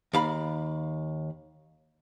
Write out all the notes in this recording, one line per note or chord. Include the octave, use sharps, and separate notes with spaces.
D#2 F5 B5